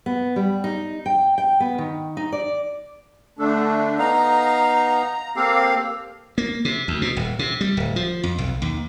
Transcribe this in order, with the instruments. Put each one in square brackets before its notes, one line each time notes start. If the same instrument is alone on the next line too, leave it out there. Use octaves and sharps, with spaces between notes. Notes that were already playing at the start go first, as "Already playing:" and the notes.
[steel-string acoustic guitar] B3
G3
D#4
G5
G5
B3
D#3
D#4
D5
[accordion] D3 A3 D4 [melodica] A4
[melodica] B3 D#4 F5 [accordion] A#5
[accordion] A#3 C4 F5 [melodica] G4 A4
[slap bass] A#3
C3
D2
B2
D#1
C3
G3
D1
F3
F2
B1
D#2